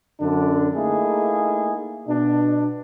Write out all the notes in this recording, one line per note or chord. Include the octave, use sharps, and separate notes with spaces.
F#2 D3 D4
A3 A#3 D#4 E4 G#4
B2 D4